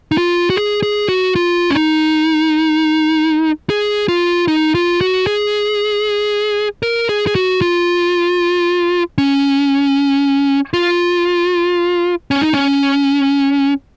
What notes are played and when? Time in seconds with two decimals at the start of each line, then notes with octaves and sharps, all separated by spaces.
0.12 D#4
0.18 F4
0.50 F#4
0.56 G#4
0.83 G#4
1.09 F#4
1.36 F4
1.70 C#4
1.74 D#4
3.70 G#4
4.08 F4
4.48 D#4
4.75 F4
5.01 F#4
5.27 G#4
6.83 A#4
7.09 G#4
7.27 G#4
7.35 F#4
7.61 F4
9.18 C#4
10.74 F4
12.31 C#4
12.42 D#4
12.53 C#4